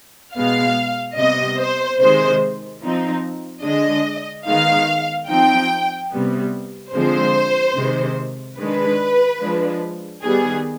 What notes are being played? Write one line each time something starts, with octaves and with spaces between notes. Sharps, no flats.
B2 G#3 B3 F5
C3 G3 B3 D#5
C5
C3 D#3 G#3 C5
F3 C4 D#4
D3 G#3 D4 D#5
D#3 G#3 B3 D#4 F5
F3 C4 D#4 G5
C3 G3 B3
D3 F3 G#3 C4 C5
C3 D#3 G#3
D#3 G#3 D4 B4
F3 G#3 D4
D#3 G3 B3 G#4